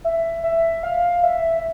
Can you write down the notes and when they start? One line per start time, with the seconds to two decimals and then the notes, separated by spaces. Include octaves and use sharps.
0.04 E5
0.44 E5
0.83 F5
1.23 E5